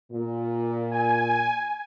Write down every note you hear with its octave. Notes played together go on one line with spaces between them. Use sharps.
A#2
G#5